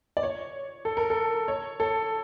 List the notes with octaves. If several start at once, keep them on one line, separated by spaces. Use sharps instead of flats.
D5
C#5
A4
A#4
A4
C#5
A4